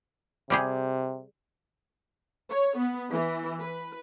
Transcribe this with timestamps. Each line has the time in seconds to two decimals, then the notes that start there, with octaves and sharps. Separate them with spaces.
0.50 C3 G3 G4 G#4
2.49 C#5
2.77 B3
3.10 E3
3.61 B4